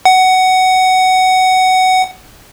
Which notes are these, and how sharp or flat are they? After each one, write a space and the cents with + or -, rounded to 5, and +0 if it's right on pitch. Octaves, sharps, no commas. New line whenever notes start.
F#5 +15